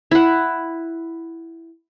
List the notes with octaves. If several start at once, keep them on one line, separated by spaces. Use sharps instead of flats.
E4 F#5